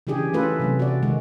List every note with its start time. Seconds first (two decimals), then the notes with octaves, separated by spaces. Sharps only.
0.07 C#3 E3 D4 G4 G#4
0.33 E3 A3 C#4 F4 A4 B4
0.60 C3 F#3 A3
0.79 F#4 D5
1.03 D#3 G#3